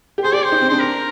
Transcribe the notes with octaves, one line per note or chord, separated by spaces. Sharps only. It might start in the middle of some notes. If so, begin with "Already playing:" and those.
G4
G#4 C5
G4 D5
C5
D#4
C4
D4 C5
A#4